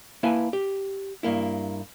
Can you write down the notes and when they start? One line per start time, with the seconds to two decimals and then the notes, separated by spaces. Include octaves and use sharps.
0.23 A#3 E4 B4 E5 G#5 A5
0.53 G4
1.23 G2 A#3 E4